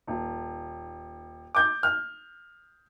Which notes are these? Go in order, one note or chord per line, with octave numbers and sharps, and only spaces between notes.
D#1
D6 G6
F6